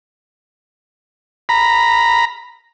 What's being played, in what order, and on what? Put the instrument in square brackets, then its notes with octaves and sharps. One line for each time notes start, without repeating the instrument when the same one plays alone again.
[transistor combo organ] A#5 B5